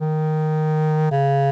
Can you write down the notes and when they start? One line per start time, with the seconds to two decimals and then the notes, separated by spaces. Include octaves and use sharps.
0.01 D#3
1.11 C#3